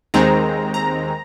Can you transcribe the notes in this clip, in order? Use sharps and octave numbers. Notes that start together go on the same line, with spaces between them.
D#2 D#3 G#3 C4 A#5
A#5